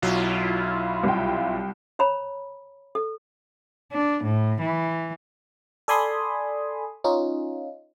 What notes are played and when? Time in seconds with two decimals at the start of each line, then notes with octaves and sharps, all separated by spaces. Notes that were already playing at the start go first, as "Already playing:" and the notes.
0.02 B1 F#3 E4 F4
1.04 C2 G5
1.99 C5 C#5 A#5 B5
2.95 A4
3.92 D4
4.24 A2
4.61 E3
5.88 A4 D5 G#5 B5 C6 D#6
7.04 C#4 D#4 F4